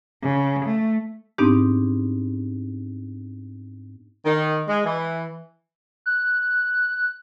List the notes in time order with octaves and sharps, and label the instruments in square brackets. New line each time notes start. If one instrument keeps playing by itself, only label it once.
[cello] C#3
A3
[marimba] G#2 B3 C4 D4 D#4 G4
[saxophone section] D#3
G#3
E3
[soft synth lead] F#6